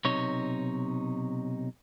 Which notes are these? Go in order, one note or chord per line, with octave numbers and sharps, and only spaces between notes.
B1 C3 D#4 C#5